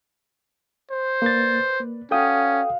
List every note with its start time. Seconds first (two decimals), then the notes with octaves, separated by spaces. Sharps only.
0.91 C5
1.22 A#3 B4 D5 A6
1.80 A#3
2.11 C#4 F#4 A4 F5 G5 D#6